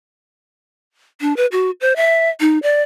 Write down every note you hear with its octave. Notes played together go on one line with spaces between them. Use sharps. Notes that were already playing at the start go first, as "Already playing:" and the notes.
D4
B4
F#4
C5
E5
D#4
D5